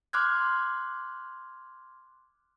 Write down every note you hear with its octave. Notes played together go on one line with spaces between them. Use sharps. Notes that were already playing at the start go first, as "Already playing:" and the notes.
C6 D6 F6 F#6 G#6